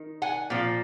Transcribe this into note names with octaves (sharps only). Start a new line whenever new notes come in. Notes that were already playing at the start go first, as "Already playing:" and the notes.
Already playing: D#3
F#5 G#5
A#2 F3